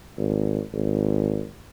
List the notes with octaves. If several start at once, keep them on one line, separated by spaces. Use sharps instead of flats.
G#1
G#1